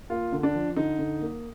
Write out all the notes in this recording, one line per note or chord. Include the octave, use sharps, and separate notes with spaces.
A#3 F4
D3
D4
F3
D3 D#4
D3
A#3